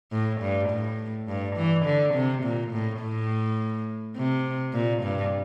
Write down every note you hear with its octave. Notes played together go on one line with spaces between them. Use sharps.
A2
G2
A2
G2
E3
D3
C3
A#2
A2
A2
C3
A#2
G2